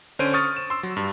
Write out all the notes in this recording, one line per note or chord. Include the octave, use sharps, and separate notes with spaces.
D3 C#4 C5 D7 D#7
C#6 D#6 F6 A6
E7
C6 E6
F#3
G2